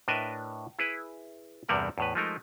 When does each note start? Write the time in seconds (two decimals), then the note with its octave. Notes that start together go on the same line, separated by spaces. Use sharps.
0.08 A2 D4 A#4 B4 D#5 E5
0.79 E4 G#4 B4
1.69 E2 G2 C3 G3 A#4 F#5
1.98 E2 A2 B4
2.15 F3 G#3 A3 D#4 A#4